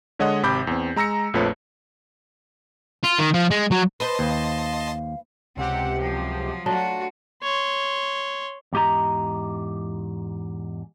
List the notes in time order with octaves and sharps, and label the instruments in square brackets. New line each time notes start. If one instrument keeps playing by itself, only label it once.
[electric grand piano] D3 G#3 C#5 D#5 F#5 D#6
G#1 C3 B5 D6 G6
E2 C4
G#3 A#5 E6 A#6 C#7
A#1 F2 F3 A3 B4 C#5
[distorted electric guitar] F4
D#3
F3
G#3
F#3
[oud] B4 C5 [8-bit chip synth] D#5 A5 C6
[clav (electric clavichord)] D#2 [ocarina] F5
[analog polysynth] C#2 C3 G4 [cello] C4 F#5
[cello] F3 F#3
[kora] F#3 A3 D4 [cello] F4 F#4
[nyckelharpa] C#5 C6
[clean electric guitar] E2 G#2 G4 D#5 A#5